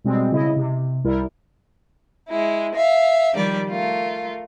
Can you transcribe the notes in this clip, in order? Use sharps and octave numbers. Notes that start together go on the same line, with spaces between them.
B2 G3 G#3 C4
C#3 E4 D#5
C3
C2 G3 E4 A#4
G#3 E4
E5 F5
D#3 F3 G3 G4 D5
A3 F4 A#4